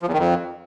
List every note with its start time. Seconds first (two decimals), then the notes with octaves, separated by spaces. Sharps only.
0.03 F3
0.08 E2
0.13 D#3
0.18 F2